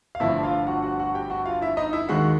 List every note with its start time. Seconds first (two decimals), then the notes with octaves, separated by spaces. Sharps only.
0.15 F5
0.20 G1 G2 D3 F3 A3 E4 E5
0.43 F4 F5
0.67 F#4 F#5
0.83 F#4 F#5
0.99 F#4 F#5
1.15 G4 G5
1.30 F#4 F#5
1.46 F4 F5
1.61 E4 E5
1.77 D#4 D#5
1.93 E4 E5
2.09 D#2 D#3 G#3 F#4 F#5